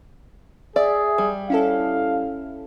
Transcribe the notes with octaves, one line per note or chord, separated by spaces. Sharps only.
G#4 D5 E5
G3
C#4 E4 A4 F5